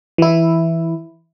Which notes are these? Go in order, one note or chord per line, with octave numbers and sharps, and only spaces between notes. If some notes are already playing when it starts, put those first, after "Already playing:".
E3 E4